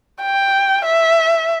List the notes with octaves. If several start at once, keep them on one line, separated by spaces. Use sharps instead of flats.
G5
E5